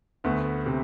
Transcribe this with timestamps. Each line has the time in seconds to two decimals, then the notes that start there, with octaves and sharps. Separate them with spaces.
0.24 D2 A3 B3
0.66 C3